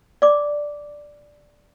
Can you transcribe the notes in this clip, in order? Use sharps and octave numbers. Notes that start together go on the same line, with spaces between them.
D5 D6